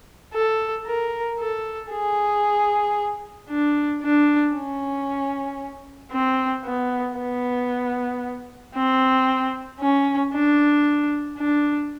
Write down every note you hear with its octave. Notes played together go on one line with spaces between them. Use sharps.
A4
A#4
A4
G#4
D4
D4
C#4
C4
B3
B3
C4
C#4
D4
D4